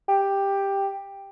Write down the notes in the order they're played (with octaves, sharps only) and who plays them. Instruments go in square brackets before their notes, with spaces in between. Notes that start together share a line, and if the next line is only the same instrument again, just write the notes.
[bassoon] G4